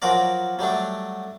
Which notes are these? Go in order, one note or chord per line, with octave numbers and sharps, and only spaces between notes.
F3 F#3 F#4 A#4 D5
F#3 G3 A3 D4